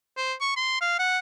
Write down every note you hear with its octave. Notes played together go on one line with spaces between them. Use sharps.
C5
C#6
C6
F5
F#5